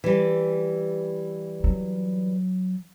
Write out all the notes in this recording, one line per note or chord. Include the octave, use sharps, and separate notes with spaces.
E3 G3
F#3